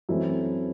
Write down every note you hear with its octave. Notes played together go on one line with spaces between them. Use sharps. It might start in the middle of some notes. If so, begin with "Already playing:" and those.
F#2 E3 A3 C4 E4